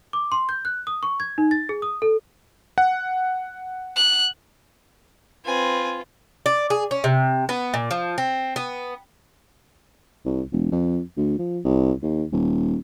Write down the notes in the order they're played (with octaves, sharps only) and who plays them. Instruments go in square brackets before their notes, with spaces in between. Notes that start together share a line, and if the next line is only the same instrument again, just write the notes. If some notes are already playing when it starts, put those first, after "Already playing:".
[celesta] D6
C6
G6
F#6
D#6
C#6
G#6
D#4
A6
G#4
D#6
A4
[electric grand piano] F#5
[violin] F#6
[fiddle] C4 G#5 [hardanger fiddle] F4 B4
[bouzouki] D5
G#4
C#4
C3
B3
A#2
F3
C4
B3
[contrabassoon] C2
E1
F2
D2
F3
C2
D#2
D#1